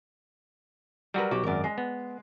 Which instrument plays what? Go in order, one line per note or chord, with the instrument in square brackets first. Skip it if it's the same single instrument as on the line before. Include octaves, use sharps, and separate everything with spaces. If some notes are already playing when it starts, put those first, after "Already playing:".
[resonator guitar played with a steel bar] F#3 A#4 [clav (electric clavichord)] G3 F#4 B4
[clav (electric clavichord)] B1 [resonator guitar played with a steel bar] F#4 G4
[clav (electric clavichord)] G#1 F#2 [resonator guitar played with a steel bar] A#4 D5
[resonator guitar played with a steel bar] G#3
[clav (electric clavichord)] B3